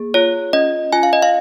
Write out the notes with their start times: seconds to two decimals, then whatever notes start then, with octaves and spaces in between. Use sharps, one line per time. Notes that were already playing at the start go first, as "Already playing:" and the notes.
Already playing: A#3 G#4
0.14 F4 C#5
0.53 C#4 D#5
0.92 F4 G#5
1.03 F5
1.13 D#5
1.22 F5